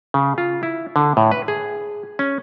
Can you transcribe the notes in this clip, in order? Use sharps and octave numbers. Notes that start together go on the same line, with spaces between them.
C#3
F4
E4
D3
A2
B4
G#4
C#4